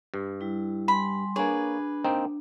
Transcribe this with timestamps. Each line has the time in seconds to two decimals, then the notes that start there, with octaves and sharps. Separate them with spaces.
0.14 G2
0.41 G3 E4
0.88 G3 G#5 B5 C6
1.36 A#3 D4 G#4 B4 C#5
2.04 A#3 C4 D#4